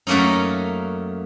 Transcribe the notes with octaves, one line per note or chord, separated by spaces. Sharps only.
F#2 A3 A#3 C#4 D#4